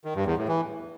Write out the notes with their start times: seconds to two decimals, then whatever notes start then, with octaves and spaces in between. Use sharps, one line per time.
0.05 D#3
0.15 G2
0.26 E2
0.37 A2
0.48 E3